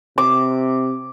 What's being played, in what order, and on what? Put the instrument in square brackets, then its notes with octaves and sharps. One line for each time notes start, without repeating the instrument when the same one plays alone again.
[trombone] C3 [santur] D6